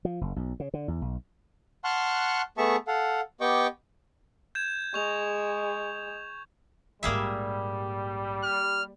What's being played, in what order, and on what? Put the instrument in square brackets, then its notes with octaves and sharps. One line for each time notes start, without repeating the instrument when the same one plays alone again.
[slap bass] F3
F#1
B1
C#3
D3
E2
B1
[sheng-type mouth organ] F#5 A5 C6 C#6 F6 F#6
A3 B3 G#4 E5 A5 C#6
A4 F5 F#5
B3 G4 D#5 G5 C#6 D6
[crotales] G6 G#6 E7
[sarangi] G#3 [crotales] C#6 F7
[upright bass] A#1 G#2 [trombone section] G3 [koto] A#3 G#4 E5
[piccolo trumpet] F6